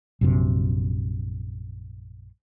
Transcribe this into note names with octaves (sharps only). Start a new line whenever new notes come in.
A#1 F#2 C3